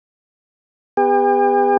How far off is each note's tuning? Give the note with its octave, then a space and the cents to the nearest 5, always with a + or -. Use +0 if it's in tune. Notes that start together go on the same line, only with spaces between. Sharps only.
B3 +15 G4 +45